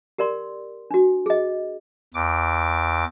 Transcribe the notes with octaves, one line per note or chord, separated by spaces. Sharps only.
G4 A#4 D5 C6
D4 F#4
G#4 D#5
E2 D6